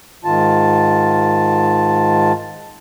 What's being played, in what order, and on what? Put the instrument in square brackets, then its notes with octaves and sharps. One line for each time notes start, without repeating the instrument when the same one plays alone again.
[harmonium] G#2 D#3 F4 A5